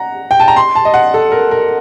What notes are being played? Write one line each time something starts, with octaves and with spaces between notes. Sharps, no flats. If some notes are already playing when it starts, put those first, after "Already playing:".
Already playing: F#5 A#5
G5
A5
A#5
C6
A5
D#5
F#5
A4
A#4
A#4